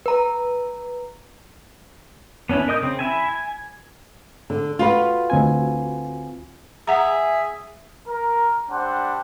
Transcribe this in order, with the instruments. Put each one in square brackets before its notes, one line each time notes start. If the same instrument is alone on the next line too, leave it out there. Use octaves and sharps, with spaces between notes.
[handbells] B4 A#5
[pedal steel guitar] B3 C#4 D4 E4
A#4 D#5 D#6 G6
C#3 C4
E4 E5 G#5
G#5
[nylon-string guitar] D3
F4 F#4 B4
[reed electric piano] D2 C4 G#5
[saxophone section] G#4 E5 [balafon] F#5 A#5
[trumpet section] A#4
G3 C4 D4 C5 F#5